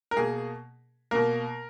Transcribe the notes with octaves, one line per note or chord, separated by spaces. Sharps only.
A#4
B2 A#3 G#4
B2 A#3 A#4